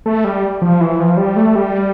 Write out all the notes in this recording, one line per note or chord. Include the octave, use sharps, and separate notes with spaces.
A3
G3
F3
E3
F3
G3
A3
G3